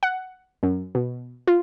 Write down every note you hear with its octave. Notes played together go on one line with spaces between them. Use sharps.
F#5
F#2
B2
F4